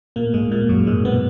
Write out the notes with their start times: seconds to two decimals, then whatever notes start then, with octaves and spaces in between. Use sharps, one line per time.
0.16 A#2 A#3
0.34 G#2 G#3
0.51 A#2 A#3
0.69 F#2 F#3
0.87 G#2 G#3
1.05 B2 B3